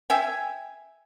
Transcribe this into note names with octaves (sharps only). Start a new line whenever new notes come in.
E5 G5 G#5